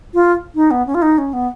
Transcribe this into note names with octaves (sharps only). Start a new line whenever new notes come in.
F4
D#4
B3
C#4
F4
D#4
C#4
B3